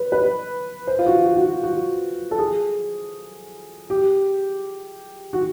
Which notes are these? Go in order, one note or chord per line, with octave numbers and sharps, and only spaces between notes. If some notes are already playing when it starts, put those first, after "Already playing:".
Already playing: B4
B4
C5
F4
F#4
F#4
F#4
F4
F#4
A4
G#4
G4
F#4